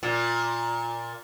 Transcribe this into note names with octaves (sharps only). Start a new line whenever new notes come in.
A#2